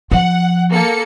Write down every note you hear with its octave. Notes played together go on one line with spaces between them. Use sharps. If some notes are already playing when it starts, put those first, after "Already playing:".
F3 F#5
A#3 A4 C#7